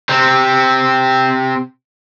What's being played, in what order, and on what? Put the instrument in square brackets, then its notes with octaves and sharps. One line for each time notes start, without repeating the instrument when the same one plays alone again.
[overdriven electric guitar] C3 C4